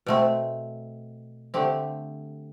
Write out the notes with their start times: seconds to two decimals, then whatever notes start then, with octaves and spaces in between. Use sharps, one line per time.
0.06 B2 A3 C4
1.54 D3 A3 C4 G4